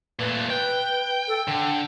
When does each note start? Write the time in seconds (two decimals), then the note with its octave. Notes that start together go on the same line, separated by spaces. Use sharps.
0.19 A#2 A3 B4
0.50 B4 G5
1.28 A4
1.48 D3 G5